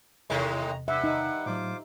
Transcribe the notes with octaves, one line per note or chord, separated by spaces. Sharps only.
E2 A2 C3 D#3 G#3 A#5
G2 E5 F#5
D#4
A2 F#3 F4 C5 D6